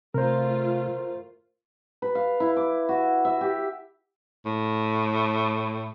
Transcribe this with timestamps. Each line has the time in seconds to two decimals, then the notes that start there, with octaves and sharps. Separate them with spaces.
0.14 C3 A3 F4 A#4 C5
2.02 B4
2.15 F5
2.40 E4
2.57 D6
2.89 F#4
3.25 E5
3.41 G4
4.46 A2